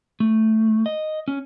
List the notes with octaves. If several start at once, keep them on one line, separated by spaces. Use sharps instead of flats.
A3
D#5
C#4